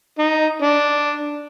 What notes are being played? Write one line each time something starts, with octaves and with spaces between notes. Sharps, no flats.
D#4
D4